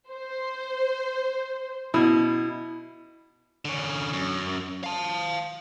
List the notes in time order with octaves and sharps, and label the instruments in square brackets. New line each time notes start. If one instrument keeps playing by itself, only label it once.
[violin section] C5
[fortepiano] B2 [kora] E4
[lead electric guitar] D3 C#4
F#2
F5 A5